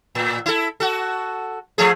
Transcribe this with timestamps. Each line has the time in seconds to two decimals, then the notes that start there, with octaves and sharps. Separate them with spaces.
0.15 A2
0.46 E4 A4
0.80 F#4 A4
1.78 F3 A3 G#4